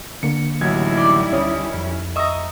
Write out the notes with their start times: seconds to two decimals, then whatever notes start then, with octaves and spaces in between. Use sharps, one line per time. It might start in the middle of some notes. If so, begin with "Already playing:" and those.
0.23 D3 A#3 C#7
0.61 A1 D#3 F#3 G3 E4 G#6
0.97 G4 D5
1.32 D2 C#4 C#5 D#6
1.74 F2
2.16 D#5 E5 A#5 C#6 D#6